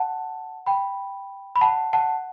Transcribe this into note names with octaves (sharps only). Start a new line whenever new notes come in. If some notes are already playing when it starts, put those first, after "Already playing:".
Already playing: F#5 A5
G5 B5
B5
F#5 A5
F#5 A5